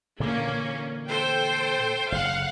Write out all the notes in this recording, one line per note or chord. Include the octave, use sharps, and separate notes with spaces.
A#2 D3 E3 A#3 C#4
A4 C5 G5
F#1 F5 F#5